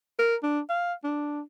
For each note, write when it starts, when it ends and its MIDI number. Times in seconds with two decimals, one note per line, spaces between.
0.19 0.36 70
0.43 0.60 62
0.69 0.93 77
1.04 1.41 62